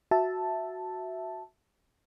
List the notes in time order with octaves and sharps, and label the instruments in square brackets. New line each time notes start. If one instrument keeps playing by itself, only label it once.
[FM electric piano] F#4 E5 A5